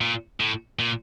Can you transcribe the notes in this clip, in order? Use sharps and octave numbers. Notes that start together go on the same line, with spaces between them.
A#2
A2
A#2